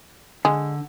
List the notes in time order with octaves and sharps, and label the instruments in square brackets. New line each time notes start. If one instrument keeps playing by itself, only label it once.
[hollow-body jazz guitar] D3 [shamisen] G#3